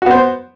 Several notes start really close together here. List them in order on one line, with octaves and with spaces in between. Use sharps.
F#4 B3 C5